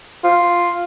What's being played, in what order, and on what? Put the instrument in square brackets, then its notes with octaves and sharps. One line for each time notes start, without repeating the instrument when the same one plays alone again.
[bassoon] F4